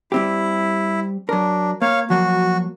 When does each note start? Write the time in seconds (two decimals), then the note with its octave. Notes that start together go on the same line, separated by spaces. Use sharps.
0.12 G3 C4 E4 G4
1.29 F#3 D4 A#4
1.82 A#3 C#5 F5
2.10 F3 F#3 A#3 F#4